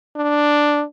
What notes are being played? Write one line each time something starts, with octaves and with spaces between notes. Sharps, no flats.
D4